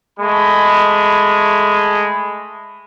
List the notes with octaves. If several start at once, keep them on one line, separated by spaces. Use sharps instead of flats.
G#3 A3 B5